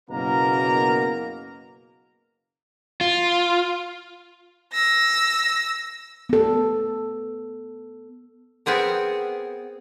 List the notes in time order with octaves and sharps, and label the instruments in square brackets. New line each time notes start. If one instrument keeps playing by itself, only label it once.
[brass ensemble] F#1 B2 A#3 A#4 A#5
[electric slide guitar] F4
[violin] E6 A#6
[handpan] B3 A4
[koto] B3 C4 G#4 A#4